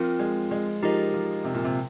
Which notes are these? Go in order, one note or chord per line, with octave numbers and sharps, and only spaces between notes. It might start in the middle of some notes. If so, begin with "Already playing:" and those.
Already playing: F3 C4 F4 A#4
G#3
G#3
F3 D#4 G4 A#4 D#5
F3
C3
A#2
C3